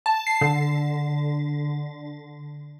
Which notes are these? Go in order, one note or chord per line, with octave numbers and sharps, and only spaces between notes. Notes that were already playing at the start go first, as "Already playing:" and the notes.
A5
C7
D3